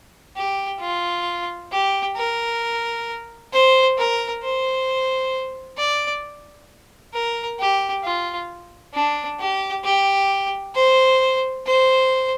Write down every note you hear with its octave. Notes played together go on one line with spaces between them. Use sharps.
G4
F4
G4
A#4
C5
A#4
C5
D5
A#4
G4
F4
D4
G4
G4
C5
C5